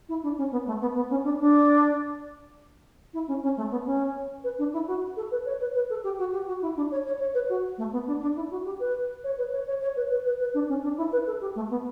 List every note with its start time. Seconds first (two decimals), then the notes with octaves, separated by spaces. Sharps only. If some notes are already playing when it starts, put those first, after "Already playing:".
0.09 E4
0.23 D4
0.38 C#4
0.52 B3
0.67 A3
0.81 B3
0.96 B3
1.10 C#4
1.25 D4
1.39 D4
3.14 E4
3.28 C#4
3.43 C#4
3.57 A3
3.71 B3
3.86 C#4
4.44 B4
4.58 D4
4.73 E4
4.88 F#4
5.17 A4
5.31 B4
5.46 C#5
5.61 B4
5.75 B4
5.90 A4
6.04 G4
6.19 F#4
6.33 G4
6.47 F#4
6.62 E4
6.77 D4
6.91 C#5
7.06 C#5
7.20 C#5
7.34 B4
7.49 F#4
7.78 A3
7.93 B3
8.07 D4
8.22 D4
8.36 E4
8.51 F#4
8.65 G4
8.80 B4
9.24 C#5
9.38 B4
9.53 C#5
9.67 C#5
9.81 C#5
9.96 B4
10.10 B4
10.25 B4
10.40 B4
10.54 D4
10.69 C#4
10.83 D4
10.98 E4
11.12 B4
11.27 A4
11.41 G4
11.56 A3
11.71 B3